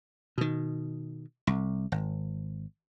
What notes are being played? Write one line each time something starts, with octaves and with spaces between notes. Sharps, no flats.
B2 D#3
C2
G#1